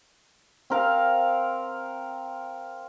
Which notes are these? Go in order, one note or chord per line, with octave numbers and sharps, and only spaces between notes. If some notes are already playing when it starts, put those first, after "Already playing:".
C4 A#4 F5